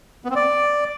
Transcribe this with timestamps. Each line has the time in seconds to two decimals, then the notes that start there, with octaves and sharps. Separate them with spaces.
0.25 B3
0.30 C4
0.36 D5